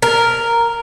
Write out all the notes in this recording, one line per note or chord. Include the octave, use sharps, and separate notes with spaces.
A#4